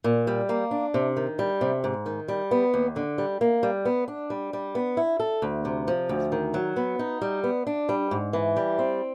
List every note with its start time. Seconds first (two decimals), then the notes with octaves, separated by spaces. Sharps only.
0.04 A#2
0.27 G3
0.49 A#3
0.71 D4
0.94 C3
1.17 D#3
1.39 G3
1.61 C3
1.84 G#2
2.06 D#3
2.28 G3
2.51 B3
2.74 D#2
2.96 D3
3.18 G3
3.41 A#3
3.63 G3
3.85 B3
4.08 D4
4.30 G3
4.53 G3
4.75 B3
4.97 E4
5.20 A4
5.42 D2
5.65 C3
5.88 F3
6.09 D2
6.32 D#3
6.54 F#3
6.76 B3
6.99 D#4
7.21 G3
7.44 B3
7.67 D4
7.89 G3
8.11 G#2
8.33 E3
8.57 G3
8.79 C4